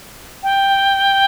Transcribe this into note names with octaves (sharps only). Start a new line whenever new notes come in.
G5